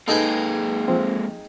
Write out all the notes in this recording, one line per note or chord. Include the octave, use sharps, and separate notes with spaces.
G#3 A#3 D#4 G#4 A4 B4 G5
F3 C4